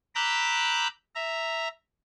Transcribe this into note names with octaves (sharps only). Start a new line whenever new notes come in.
A#5 B5 D6 E6 F#6 G6
E5 A#5